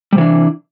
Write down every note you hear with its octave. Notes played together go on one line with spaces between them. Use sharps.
C3 E3 G3 D4